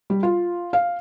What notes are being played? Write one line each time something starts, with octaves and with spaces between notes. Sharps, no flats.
G3
F4
F5